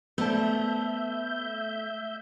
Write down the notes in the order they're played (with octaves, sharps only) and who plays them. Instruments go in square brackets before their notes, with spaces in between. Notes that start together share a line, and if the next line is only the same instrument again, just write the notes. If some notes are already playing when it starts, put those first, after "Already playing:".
[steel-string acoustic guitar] A3 [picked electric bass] B3 [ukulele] C5 D5 A5 [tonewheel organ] E5 G6